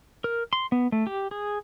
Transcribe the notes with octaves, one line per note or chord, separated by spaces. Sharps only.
A#4
C6
B3
A3
G4
G#4